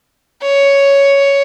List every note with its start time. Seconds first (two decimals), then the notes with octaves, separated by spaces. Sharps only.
0.42 C#5